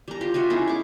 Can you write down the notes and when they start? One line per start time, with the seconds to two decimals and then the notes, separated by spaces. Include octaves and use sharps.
0.08 G3 A#5
0.21 F4 G4
0.34 F4 F#4 D#5 E5
0.50 C#4 D#4 E4 G#4
0.67 C#6 D6